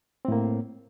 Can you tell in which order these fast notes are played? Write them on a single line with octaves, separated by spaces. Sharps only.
C4 A2 A#3